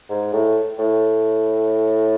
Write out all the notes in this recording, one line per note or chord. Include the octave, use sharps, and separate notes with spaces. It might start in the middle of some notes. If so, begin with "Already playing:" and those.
G#2
A2
A2